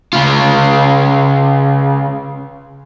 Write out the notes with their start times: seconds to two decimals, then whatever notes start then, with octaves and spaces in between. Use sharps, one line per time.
0.13 C#3 F4